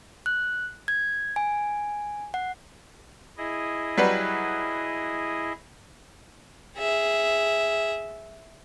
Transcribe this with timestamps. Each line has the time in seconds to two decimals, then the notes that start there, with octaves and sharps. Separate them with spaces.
0.26 F#6
0.88 G#6
1.36 G#5
2.34 F#5
3.38 E4 G#4 D#5
3.98 F#3 G3 B4
6.77 G#4 E5